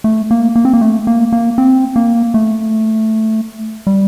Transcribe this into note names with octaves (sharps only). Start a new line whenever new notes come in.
A3
A#3
A#3
C4
A#3
A3
A#3
A#3
C4
A#3
A3
G3